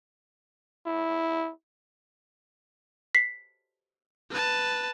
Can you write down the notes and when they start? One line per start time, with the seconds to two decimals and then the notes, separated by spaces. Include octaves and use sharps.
0.86 E4
3.15 B6 C7
4.30 B4 A5